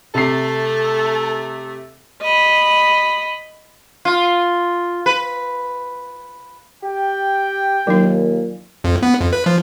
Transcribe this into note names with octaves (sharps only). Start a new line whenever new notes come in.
C3 A3 A4 C7
D#5 B5
F4
B4
G4 G5
D#2 A#2 F#3 D#4
F2
B3
F2
B4
F3